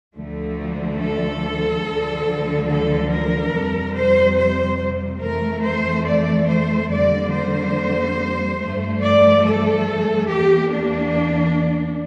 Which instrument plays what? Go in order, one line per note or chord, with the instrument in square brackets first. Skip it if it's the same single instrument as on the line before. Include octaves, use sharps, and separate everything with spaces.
[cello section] D2 D3 F3 A3
A4
D2 D3 F3
A4
A#4
F2 C3 G3
C5
C5
F2 E3 A3 A#4
C5
D5
C5
F2 D3 G3 A#3 D5
C5
G2 F3 A3
D5
A4
E2 E3 A#3 G4
D4